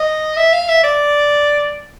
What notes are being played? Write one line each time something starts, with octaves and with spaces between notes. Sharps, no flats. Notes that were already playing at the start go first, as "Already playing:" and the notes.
Already playing: D#5
E5
F5
E5
D5